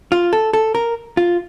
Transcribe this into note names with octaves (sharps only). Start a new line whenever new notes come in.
F4
A4
A4
A#4
F4